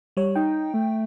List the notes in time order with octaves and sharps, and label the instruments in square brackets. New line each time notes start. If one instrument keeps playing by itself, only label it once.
[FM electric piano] G3 C#5
[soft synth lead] D#4 [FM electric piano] G5
[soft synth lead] A3